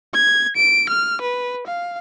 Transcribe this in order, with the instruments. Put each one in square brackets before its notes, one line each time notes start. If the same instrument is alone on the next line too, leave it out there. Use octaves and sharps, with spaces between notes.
[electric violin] G#6
D7
F6
B4
F5